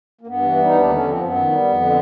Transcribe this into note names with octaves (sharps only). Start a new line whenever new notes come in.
A#3
G2 B3
E3
G3
D#4
D#2
D4
D3 C#4
F3 C4
F#2 B3
D#3
G3
F2
D3